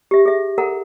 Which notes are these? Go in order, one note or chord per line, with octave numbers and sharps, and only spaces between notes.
G4 E5
G#4 E5
A4 A#4 F#5 A#5